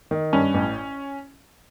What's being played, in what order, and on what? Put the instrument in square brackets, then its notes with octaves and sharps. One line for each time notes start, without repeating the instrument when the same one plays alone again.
[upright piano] D#3
[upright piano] G2 [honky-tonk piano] C#4
[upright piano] A1